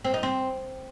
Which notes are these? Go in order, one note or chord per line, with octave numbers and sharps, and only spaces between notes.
C4
D#4
C4